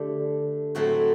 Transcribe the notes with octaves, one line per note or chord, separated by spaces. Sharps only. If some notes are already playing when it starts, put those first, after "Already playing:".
Already playing: D3 A3 D4 G4
A2 F#3 A3 C4 F#4